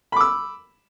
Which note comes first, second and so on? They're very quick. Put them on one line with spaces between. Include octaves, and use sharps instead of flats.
B5 D6 E6